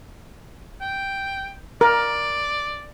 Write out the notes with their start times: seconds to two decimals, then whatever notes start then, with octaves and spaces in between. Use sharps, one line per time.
0.81 G5
1.81 A#4 D5